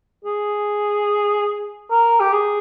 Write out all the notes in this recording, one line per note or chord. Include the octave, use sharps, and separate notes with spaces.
G#4
A#4
G4
G#4